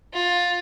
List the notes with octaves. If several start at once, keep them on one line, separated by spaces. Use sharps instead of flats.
F4